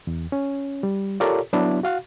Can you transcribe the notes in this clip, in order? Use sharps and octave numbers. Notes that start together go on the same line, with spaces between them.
E2
C#4
G3
F4 G4 A4 A#4 C#5 D5
F#3 B3 D4 E4
F#4 F5 F#5